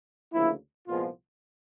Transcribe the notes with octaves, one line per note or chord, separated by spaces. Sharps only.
D2 C#3 F3 A#3 E4
C2 A#2 F3 G#3 B3 F4